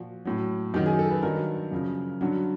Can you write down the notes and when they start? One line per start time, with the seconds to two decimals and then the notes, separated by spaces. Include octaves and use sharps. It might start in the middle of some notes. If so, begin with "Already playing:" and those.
Already playing: A#2 F3 F#4
0.25 A2 F#3
0.74 F#2 D#3 F#3 G4
0.86 G#4
0.99 A4
1.11 B4
1.22 G2 D#3 F#3 A#4
1.71 F#2 C#3 F3
2.21 G2 D3 F#3